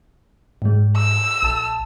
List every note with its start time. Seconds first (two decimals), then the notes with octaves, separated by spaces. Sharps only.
0.62 G#2 G#3
0.96 E6
1.43 A#1 A5